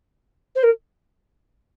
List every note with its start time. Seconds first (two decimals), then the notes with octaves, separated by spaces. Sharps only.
0.55 C5
0.63 A#4